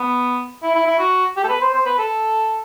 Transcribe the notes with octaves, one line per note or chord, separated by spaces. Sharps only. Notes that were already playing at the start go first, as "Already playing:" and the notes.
Already playing: B3
E4
E4
E4
F#4
G4
A4
B4
C5
C5
B4
A4